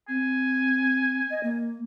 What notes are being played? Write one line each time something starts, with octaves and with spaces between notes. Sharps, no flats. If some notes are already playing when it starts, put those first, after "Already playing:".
C4 G#5
D#5
A#3